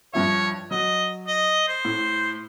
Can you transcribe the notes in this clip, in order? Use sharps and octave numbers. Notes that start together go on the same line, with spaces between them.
G2 F3 C#5 E5
F#3 D#5
D#5
C5
A2